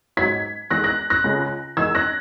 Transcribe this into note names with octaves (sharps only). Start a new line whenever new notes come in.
G#2 F#3 G#6 B6
E2 D#3 G#3 F#6 A#6
F#6 A#6
F#6 A#6
C#2 C#3 G#3
E2 D#3 G#3 E6 G#6
F#6 A#6